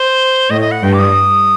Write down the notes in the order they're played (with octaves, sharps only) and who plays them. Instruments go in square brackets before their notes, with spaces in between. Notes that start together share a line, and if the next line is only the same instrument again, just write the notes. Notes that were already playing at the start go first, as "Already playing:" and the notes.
Already playing: [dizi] C5
[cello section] A2 [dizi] D#5
[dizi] D#5
F#5
[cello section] G2 [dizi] G5
[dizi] D6
D#6